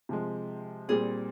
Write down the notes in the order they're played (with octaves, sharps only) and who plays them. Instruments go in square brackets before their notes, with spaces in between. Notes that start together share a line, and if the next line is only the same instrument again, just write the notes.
[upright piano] C3 F3 G#3
[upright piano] A#2 G3 C4 [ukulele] G#4